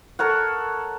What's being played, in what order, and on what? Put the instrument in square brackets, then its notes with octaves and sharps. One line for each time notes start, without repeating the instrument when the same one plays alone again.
[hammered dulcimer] A4 A#4 C#5 F#5